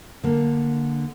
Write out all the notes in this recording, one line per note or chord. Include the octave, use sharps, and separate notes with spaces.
D3 A#3